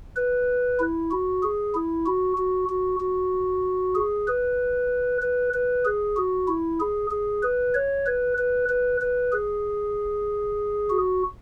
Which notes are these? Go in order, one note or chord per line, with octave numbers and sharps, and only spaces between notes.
B4
E4
F#4
G#4
E4
F#4
F#4
F#4
F#4
G#4
B4
B4
B4
G#4
F#4
E4
G#4
G#4
B4
C#5
B4
B4
B4
B4
G#4
F#4